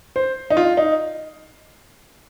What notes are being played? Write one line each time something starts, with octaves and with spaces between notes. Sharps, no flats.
C5
D#4
F4
D#4